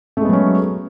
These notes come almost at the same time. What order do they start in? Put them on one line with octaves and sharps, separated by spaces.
A3 G#3 B3 F#3 C#4